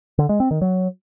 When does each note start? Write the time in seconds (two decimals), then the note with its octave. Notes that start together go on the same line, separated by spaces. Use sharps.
0.18 D3
0.29 G#3
0.40 C4
0.51 D#3
0.61 F#3